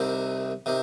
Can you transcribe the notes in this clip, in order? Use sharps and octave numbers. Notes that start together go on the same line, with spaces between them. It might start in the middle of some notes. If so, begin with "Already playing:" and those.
Already playing: C2 C3 D#3
C3 D#3